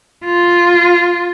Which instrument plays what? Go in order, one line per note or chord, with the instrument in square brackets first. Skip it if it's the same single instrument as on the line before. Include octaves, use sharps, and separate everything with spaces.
[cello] F4